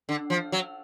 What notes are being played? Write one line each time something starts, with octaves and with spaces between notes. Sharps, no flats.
D3
F3
F#3